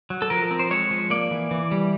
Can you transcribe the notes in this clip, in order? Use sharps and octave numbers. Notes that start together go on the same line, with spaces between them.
F#3
A4
F3 A#4
C4
C5
G#3 C#5
F3
A#3 D5
E3
E3
G3